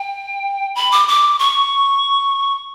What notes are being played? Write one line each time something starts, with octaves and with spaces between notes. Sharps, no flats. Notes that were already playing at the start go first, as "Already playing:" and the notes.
Already playing: G5
B5
D6
D6
C#6